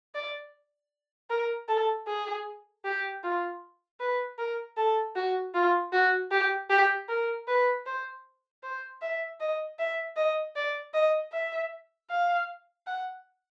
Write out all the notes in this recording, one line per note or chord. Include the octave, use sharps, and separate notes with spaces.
D5
A#4
A4
G#4
G4
F4
B4
A#4
A4
F#4
F4
F#4
G4
G4
A#4
B4
C5
C5
E5
D#5
E5
D#5
D5
D#5
E5
F5
F#5